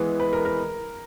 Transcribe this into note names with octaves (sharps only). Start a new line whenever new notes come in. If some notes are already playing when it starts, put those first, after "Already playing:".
Already playing: E3 G#3 B3
B4
A#4
A#4